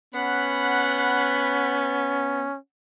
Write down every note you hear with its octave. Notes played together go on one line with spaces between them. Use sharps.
B3 C#4 F#5 B5 F#6